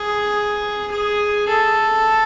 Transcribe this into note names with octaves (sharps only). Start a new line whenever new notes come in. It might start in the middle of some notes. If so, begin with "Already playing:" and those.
Already playing: G#4
G#4
A4